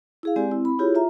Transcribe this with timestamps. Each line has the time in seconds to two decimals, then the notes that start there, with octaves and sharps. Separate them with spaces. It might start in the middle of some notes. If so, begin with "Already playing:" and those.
0.23 E4 G#4 F5
0.36 G#3 C4 G4 D5 G#5
0.51 C4 E4
0.65 B5
0.79 E4 F4 G4 G#4 C#5
0.95 F4 E5 A#5